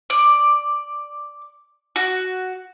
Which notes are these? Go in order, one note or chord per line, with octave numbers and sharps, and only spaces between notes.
D5
F#4